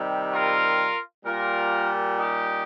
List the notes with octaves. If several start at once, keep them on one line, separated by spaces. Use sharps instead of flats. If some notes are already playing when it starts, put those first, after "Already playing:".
Already playing: C3 D#3 G3
F4 A#4
A#2 G3 F4 A#4
D#4 G4